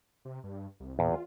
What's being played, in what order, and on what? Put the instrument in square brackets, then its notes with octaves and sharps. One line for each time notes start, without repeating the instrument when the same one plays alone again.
[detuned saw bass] C3
G2
C2
[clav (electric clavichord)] E2 [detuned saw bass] A#2
[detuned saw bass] F4